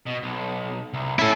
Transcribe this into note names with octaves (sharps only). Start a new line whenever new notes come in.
B2
B1
C2
C#4 E4 A4